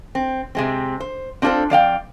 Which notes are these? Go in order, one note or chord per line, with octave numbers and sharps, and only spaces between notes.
C4
C3 G#3 C4
C5
C4 D4 F4 G#4 A4 C5
F2 D5 F5 G5